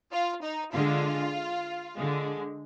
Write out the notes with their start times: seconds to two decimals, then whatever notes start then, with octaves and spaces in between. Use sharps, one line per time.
0.12 F4
0.42 D#4
0.73 D3 G#3 F4
1.96 D3 G#3